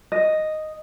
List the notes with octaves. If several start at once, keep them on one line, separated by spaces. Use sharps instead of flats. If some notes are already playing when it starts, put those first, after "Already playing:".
D#5